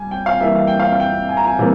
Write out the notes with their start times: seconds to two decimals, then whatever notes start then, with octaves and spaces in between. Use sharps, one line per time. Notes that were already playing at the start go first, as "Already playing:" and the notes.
Already playing: G3 G#5
0.11 G5
0.26 F5
0.40 E3 G3 A#3 E5
0.56 F5
0.67 G5
0.80 F5
0.93 F5
1.00 G5
1.29 G#5
1.37 A#5
1.47 G#5
1.58 C3 E3 G3 A#3